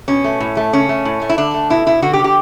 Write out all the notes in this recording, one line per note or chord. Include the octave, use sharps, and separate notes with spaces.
B2 C#4
A3
A2
A3
C#3 C#4
A3
A2
A3
E4
D3 D4
A3
B2 E4
B2 E4
D3 F#4
G4
D3
G4